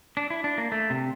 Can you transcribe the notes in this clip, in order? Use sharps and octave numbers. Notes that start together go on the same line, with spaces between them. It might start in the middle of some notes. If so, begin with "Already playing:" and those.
D4
E4
D4
A#3
A3
C3